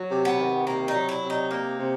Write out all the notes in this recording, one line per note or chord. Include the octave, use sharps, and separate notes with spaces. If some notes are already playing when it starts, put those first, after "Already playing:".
Already playing: F#3
C3
B3
D#3
C3 A#3
D#4
F#3
E4
C3
D#4
A#3 D#4
C3